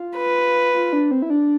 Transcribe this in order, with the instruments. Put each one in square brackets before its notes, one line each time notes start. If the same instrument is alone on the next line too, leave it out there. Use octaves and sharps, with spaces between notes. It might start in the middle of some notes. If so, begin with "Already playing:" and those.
Already playing: [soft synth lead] F4
[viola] B4
[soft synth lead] F4
D4
C4
E4
D4